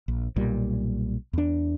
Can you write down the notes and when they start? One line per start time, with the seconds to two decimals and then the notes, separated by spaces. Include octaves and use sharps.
0.08 A#1
0.36 B1 A#2 G3
1.33 E2 D4